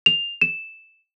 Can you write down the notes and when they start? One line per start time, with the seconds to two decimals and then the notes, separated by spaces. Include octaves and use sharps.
0.06 F7
0.41 E7